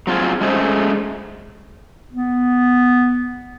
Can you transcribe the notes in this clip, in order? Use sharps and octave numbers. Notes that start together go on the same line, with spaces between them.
F#3 C4 F4 G#4
G#3 A3 C#4 G#4 C5
B3